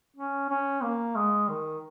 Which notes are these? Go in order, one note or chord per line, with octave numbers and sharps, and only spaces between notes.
C#4
C#4
A#3
G#3
D#3